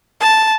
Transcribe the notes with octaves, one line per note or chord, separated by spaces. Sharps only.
A5